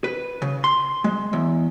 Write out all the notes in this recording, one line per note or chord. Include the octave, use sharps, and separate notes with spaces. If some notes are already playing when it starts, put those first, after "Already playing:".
B4
C#3
C6
G#3
E2